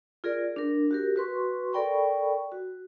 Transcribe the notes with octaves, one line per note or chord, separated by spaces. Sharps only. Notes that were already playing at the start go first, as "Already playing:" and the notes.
F4 G#4 A#4 D5
D4 A#4
F#4 G4 A#4
F#4 B4 C6 C#6
A4 A#4 D5 G5 B5 C#6
F#4